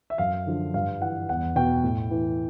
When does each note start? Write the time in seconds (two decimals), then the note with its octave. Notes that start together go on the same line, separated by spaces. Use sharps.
0.10 E5
0.18 F#2 F5
0.46 D3 F3
0.74 G2 F5
1.01 E3 F#5
1.29 E2 F#5
1.56 B2 G5
1.84 A2
2.11 E3